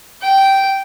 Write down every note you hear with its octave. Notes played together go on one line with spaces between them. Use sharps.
G5